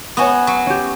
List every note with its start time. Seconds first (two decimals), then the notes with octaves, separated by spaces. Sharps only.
0.17 B3 F#4 C#5 G#5 D#6
0.47 F#3
0.66 C#4 G4